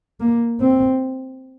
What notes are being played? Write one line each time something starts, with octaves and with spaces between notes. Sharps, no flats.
A#3
C4